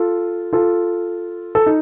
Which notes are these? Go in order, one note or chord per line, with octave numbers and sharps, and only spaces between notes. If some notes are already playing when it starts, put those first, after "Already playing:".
Already playing: F4 A4
F4 A4
A4
D#4